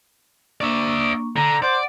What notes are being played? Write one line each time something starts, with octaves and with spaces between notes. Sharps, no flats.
A#3 D4 D5 E5 C#6
D3 A#5
C5 D5 F#5